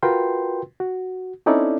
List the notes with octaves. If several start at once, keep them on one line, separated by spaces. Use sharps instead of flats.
F4 F#4 A#4 B4 G5 C6
F#4
C4 C#4 D#4 E4 A4 D5